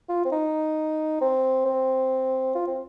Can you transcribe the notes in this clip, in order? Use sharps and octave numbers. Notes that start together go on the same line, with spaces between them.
F4
C4
D#4
C4
C4
F4
C4